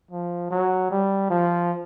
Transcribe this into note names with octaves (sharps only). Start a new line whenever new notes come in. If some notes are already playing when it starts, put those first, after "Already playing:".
F3
F#3
G3
F3